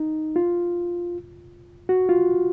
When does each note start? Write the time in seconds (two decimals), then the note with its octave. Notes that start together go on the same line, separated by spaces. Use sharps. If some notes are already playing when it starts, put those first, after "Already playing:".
Already playing: D#4
0.36 F4
1.89 F#4
2.09 F4